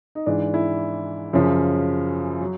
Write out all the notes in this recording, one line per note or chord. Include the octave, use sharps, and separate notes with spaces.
D#4
G#2 E3 D4
E4
F#2 C#3 F3
F#3